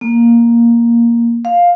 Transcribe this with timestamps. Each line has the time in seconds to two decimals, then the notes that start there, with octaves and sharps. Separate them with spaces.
0.01 A#3
1.45 F5